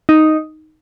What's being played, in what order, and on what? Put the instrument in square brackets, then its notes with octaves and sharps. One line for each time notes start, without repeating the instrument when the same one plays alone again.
[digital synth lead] D#4